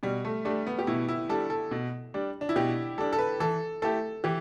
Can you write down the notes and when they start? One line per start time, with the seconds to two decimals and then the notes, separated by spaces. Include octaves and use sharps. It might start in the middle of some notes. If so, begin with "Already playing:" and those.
0.03 B2 G3
0.25 A3
0.45 G3 A3 D4
0.67 B3
0.79 G4
0.87 B2 E4
1.09 E4
1.29 G3 D4 A4
1.50 A4
1.71 B2
2.14 G3 D4
2.41 D4
2.49 E4
2.56 B2 G4
2.98 G3 D4 A4
3.13 A4
3.19 B4
3.40 E3 A4
3.82 A3 E4 G4 A4
4.24 E3 G4